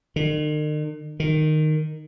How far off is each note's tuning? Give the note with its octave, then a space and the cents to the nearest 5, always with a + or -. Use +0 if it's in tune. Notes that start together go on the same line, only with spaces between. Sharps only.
D#3 -45
D#3 -10